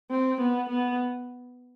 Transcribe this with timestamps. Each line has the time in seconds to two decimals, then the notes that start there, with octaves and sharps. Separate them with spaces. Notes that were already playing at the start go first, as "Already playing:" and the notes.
0.11 C4
0.41 B3
0.70 B3